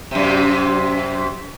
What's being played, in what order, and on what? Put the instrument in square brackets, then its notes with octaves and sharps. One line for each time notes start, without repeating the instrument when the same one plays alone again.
[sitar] F#2 C3